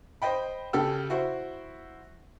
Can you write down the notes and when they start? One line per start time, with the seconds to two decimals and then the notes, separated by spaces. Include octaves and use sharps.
0.22 C5 D#5 G5 B5
0.73 C#3 G4 A4 G5 E6
1.10 E4 F#4 C5